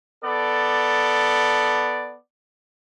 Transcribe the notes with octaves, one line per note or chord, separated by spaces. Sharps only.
B3 A4 D5